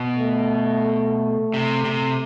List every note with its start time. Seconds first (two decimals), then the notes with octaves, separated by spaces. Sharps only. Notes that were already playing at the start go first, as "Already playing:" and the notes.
Already playing: B2
0.15 A3
1.54 C3
1.85 C3